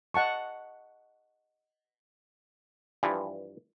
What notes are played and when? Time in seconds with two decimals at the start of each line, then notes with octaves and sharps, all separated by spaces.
0.14 D#5 F#5 A5 C#6
3.03 G2 E3 F3